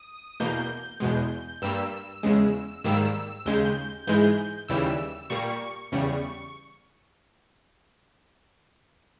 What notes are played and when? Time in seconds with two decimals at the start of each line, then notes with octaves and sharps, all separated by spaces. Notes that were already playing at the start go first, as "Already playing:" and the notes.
Already playing: D#6
0.40 E2 B2 A#3 G6
1.00 E2 B2 G#3
1.62 G2 G3 A#3 E6
2.23 E2 C#3 G#3
2.84 G#2 D#3 G3 A#3 E6
3.46 D#2 C#3 G#3 G6
4.07 G#2 E3 G#3 G6
4.69 D#2 C#3 E3 G3 E6
5.30 A#2 G3 A#3 C#6
5.92 E2 C#3 G3